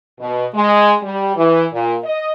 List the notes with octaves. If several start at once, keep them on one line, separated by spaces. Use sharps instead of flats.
B2
G#3
G3
E3
A#2
D#5